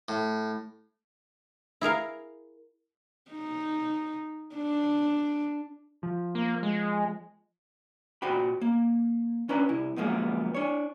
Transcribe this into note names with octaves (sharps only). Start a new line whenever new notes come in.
A2
E4 G#4 A#4 F5
D#4
D4
F3
A#3
G#3
A#2 F#4 C5 G5 B5
A#3
C#4 D4 B4 A#5
C2 E4
F#2 F3 G#3 A#3 B3
D4 C#5